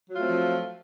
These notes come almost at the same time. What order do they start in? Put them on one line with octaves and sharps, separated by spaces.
F#3 F4 A3 C4 F3